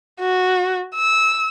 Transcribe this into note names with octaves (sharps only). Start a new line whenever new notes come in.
F#4
E6